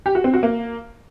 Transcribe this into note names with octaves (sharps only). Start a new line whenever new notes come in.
G4
F#4
C4
F#4
A#3